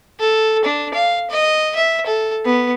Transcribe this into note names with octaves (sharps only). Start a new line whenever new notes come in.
A4
D4
F5
D#5
E5
A4
B3